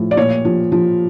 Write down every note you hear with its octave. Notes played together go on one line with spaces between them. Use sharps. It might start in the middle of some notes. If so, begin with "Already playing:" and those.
Already playing: A2 F3
D5
A#2 C#5
F3
F3